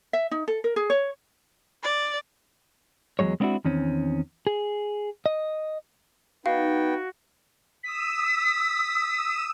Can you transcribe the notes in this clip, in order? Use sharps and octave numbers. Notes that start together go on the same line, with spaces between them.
E5
D#4
A4
A#4
G#4
C#5
D5
E2 F3 F#3 G#3 C#5
G#3 B3 C4 D4 E4 F#4
E2 D#3 C4 C#4
G#4
D#5
B3 D#4 F#4 F5 G5
D#6 E6 B6